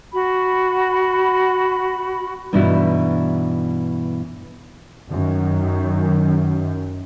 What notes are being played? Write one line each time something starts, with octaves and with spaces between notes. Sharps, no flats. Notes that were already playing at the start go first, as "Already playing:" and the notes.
F#4 B5
G2 B2 E3 D#4 E4 F#4
F#2 D#3